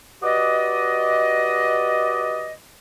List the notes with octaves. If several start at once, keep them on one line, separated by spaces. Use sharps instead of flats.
F#4 G4 B4 D5 D#5